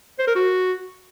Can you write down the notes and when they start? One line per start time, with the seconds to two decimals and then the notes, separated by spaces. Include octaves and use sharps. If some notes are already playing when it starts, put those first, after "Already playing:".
0.19 C5
0.27 A#4
0.35 F#4